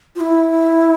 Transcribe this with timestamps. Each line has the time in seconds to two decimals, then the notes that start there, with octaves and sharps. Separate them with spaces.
0.15 F4
0.20 E4